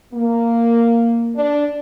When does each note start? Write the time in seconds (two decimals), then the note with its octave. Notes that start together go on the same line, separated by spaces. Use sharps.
0.14 A#3
1.36 D4